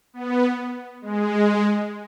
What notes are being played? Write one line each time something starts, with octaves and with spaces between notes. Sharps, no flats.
B3
G#3